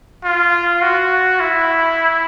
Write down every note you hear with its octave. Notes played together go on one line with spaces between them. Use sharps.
F4
F#4
E4